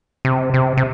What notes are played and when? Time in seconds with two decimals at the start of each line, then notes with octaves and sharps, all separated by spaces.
0.25 C3
0.54 C3
0.77 C3